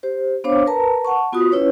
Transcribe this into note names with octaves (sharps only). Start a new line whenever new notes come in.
G4 C5
B3 D4 C5 C#5 F5 D6
A#4 B4 A5 A#5
F#5 A5 C#6
B3 F4 F#4 D#6
C#4 E4 B4 C#5